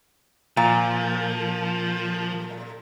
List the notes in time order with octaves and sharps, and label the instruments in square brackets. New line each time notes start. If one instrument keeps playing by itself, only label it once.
[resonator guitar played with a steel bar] A#2 [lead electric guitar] F3